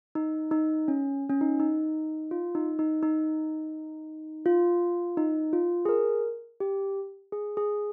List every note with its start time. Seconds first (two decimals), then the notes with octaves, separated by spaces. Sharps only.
0.15 D#4
0.51 D#4
0.88 C#4
1.30 C#4
1.41 D#4
1.59 D#4
2.31 F4
2.55 D#4
2.79 D#4
3.03 D#4
4.46 F4
5.17 D#4
5.53 F4
5.85 G#4
5.89 A#4
6.60 G4
7.32 G#4
7.57 G#4